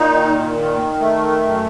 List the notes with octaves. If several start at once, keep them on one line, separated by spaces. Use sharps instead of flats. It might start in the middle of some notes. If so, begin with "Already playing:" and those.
Already playing: A#2 D#4
D#3
D#3
A3
F#2